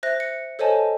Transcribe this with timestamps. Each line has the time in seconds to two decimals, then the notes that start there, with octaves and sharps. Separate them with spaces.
0.03 C5 E5 F#6 A#6
0.20 C#7
0.59 A4 C5 C#5 D#5 G#5 A5